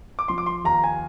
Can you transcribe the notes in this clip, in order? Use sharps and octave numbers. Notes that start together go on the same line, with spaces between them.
D6
F3 C6
D6
C6
D#2 A#5
G#5